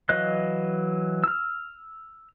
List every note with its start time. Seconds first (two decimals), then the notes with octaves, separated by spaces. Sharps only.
0.09 E3 F#3 D#5 F5 F#6
1.24 E6 F6